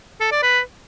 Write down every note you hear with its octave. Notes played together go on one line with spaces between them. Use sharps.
A4
D5
B4